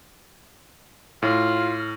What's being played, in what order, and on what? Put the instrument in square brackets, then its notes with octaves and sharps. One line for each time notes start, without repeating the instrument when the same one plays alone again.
[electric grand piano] A2 [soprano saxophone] F4 [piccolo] F6